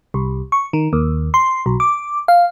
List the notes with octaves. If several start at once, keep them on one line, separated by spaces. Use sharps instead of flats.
C2
C#6
D#3
D#2
C6
B1
D6
F5